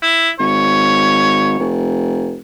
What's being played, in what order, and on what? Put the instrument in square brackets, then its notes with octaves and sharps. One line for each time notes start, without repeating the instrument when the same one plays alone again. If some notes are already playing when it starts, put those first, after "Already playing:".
[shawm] E4
[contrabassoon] G#1 [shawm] C#5
[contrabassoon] F1